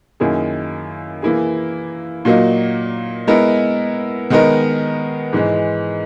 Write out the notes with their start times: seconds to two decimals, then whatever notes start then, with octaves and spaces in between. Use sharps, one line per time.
0.20 F#2 D#3 A#3 E4 G#4
1.22 E3 A#3 E4 G#4
2.25 A#2 F#3 A#3 D#4
3.27 G#3 B3 E4 A#4
4.30 D#3 G#3 B3 D#4 A#4
5.33 G#2 E3 G#3